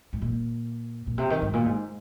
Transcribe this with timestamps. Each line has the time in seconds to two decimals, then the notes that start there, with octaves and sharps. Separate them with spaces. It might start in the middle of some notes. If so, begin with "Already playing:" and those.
0.13 G#2
0.22 A#2
1.07 A#2
1.18 C3
1.30 D#3
1.42 G#2
1.53 A#2
1.66 G#2